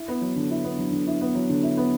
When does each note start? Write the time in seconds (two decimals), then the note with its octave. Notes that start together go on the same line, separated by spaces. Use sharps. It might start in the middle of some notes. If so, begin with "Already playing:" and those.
Already playing: E4
0.08 B3
0.21 F#3
0.36 D3
0.51 E4
0.64 B3
0.78 F#3
0.92 D3
1.07 E4
1.21 B3
1.35 F#3
1.49 D3
1.63 E4
1.77 B3